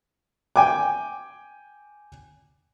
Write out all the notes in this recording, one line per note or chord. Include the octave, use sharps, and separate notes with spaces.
G5 G#5 D6